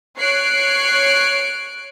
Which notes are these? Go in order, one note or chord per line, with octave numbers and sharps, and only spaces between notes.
C#5 F#6 C7 D7